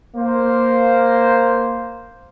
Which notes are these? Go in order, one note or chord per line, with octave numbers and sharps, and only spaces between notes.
A#3 C5